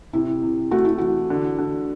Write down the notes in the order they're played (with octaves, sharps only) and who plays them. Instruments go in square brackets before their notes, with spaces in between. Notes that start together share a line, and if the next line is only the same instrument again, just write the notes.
[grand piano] C3 [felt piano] E4
[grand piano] C3
[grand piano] A3 [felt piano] F#4
[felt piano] E4
[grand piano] E3 [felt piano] F#4
[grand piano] D3
D3